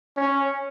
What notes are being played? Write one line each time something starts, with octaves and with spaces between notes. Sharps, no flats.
C#4